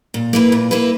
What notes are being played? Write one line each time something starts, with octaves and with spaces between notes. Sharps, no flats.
A#2
A#3 E4 B4
A#2
A#3 E4 B4